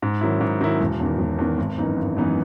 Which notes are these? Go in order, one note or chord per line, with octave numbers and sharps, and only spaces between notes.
G#2
D#3 F#3 C#4 E4
G#2
D#3 F#3 C#4 E4
E1
E2 D#3
E1
E2 D#3
G#1
F#2 E3 B3 D#4
G#1
F#2 E3 B3 D#4